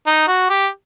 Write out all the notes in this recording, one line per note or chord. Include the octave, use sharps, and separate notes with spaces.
D#4
F#4
G4